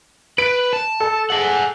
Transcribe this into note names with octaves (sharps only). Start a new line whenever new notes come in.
B4 D7
A5
A4
G#4 F#5